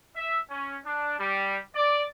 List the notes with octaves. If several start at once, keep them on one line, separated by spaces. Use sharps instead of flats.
E5
C#4
D4
G3
D5